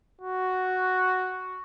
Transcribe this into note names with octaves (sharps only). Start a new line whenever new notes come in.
F#4